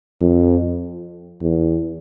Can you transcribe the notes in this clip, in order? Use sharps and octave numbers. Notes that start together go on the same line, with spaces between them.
F2
E2